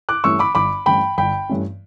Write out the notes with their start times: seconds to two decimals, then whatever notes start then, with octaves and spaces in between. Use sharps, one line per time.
0.09 D6 F#6
0.24 G2 E3 A3 C#4 C#6 E6
0.39 B5 D6
0.55 G1 B5 D6
0.86 G2 E3 A3 C#4 G5 B5
1.18 G1 G5 B5
1.49 G2 E3 A3 C#4